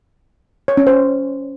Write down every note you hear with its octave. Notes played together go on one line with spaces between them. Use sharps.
C#5
C#4
C5